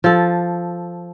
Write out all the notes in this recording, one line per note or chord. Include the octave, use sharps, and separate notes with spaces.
F3 A4